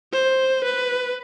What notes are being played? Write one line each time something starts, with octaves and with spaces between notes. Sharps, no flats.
C5
B4